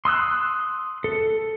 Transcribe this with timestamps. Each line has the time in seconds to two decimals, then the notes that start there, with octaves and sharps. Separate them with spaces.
0.05 C6 D#6 E6 F#6
1.04 A4